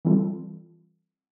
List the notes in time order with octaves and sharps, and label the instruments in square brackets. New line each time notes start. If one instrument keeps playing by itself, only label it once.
[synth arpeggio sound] E3 G3 C4 F4 A4